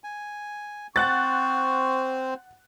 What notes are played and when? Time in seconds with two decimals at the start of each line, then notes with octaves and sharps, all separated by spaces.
0.04 G#5
0.96 C4 C5 F#5 C#6 F#6 A6